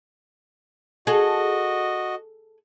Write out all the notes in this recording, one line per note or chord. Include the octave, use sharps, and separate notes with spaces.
F#4 G#4 A4 D#5